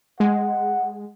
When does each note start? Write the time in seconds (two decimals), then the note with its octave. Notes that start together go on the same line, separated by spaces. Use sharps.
0.20 G#3 F#5